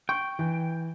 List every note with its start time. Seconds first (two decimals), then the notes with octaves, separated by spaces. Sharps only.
0.09 G5 C#6
0.39 E3